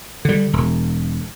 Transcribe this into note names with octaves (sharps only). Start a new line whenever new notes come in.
D3 G3
E1